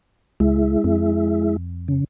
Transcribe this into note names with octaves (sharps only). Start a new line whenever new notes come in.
C#2 G#3 E4
F2
C#3